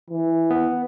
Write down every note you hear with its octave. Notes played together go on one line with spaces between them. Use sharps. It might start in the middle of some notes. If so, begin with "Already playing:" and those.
E3
B3